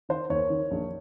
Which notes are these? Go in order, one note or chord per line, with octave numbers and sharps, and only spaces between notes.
D#3 C5
D#2 C#5
D#3
A#1